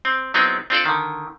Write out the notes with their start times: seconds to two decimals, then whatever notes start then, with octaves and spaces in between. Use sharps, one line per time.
0.05 C4
0.34 F#3 B3 C4 D#4 E4 G#4
0.70 C4 D4 F4 A4 C5 D5
0.86 D3 D#3